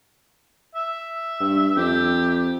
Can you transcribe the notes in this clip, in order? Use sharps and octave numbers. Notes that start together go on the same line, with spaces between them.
E5
G2
F2 G4